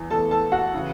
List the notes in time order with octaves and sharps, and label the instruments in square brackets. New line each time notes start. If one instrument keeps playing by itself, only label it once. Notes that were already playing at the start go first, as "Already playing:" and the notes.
Already playing: [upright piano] E2 E3
E2 E3 A3 A4 A5
A4 A5
F#4 F#5
C#3 E3